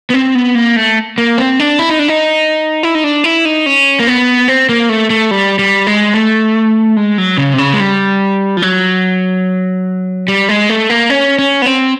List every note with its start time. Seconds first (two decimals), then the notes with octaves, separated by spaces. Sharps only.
0.10 B3
0.14 C4
0.35 B3
0.55 A#3
0.76 A3
1.18 A#3
1.38 C4
1.60 D4
1.79 E4
1.89 D#4
1.99 D4
2.08 D#4
2.83 E4
2.95 D#4
3.04 D4
3.24 E4
3.45 D#4
3.66 C#4
4.00 A#3
4.07 B3
4.48 C4
4.69 A#3
4.89 A3
5.10 A3
5.31 G3
5.59 G3
5.87 G#3
6.14 A3
6.96 G#3
7.18 F#3
7.38 C#3
7.53 C3
7.58 C#3
7.74 G#3
7.80 G3
8.57 F3
8.62 F#3
10.28 G3
10.49 G#3
10.70 A3
10.90 A#3
11.10 C#4
11.39 C#4
11.62 B3
11.66 C4